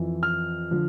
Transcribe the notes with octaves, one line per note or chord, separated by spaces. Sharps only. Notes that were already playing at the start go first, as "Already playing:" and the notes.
Already playing: F2 E3
F6
D3 F3